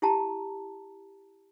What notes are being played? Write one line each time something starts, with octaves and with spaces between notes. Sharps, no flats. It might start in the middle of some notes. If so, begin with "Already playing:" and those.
E4 G4 A5 A#5